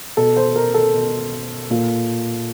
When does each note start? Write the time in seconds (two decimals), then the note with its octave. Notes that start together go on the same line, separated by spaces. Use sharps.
0.17 B2 A4
0.36 C5
0.56 A#4
0.74 A4
0.94 B2
1.70 A#2